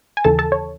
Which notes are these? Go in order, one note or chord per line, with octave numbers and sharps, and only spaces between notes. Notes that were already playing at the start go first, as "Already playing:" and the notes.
G#5
D#2 C#3 E3 A4 A5
A4 A5
C#5